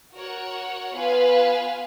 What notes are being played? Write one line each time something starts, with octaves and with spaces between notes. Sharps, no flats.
F#4 A#4 C#5 F#5
B3 F4 B4 F5 G#5